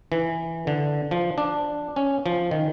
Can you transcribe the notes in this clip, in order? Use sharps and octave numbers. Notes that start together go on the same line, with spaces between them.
E3
D3
F3
D4
C#4
F3
D#3